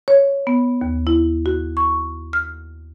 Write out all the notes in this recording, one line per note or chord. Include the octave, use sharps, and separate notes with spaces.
C#5
B3
D#2
E4
F#4
C#6
F6